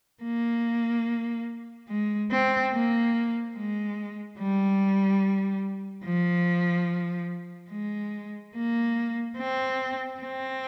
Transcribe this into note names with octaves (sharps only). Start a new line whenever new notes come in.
A#3
G#3
C4
A#3
G#3
G3
F3
G#3
A#3
C4
C4